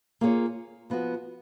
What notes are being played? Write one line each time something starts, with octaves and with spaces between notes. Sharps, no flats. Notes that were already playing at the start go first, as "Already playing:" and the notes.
A#3 F4 G#4 C#5
F3 B3 F#4 B4